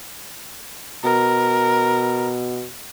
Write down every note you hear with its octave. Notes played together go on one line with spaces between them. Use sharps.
B2 A#4